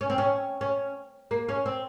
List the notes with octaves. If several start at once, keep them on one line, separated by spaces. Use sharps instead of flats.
C#4
C4
C#4
C#4
A#3
C#4
C4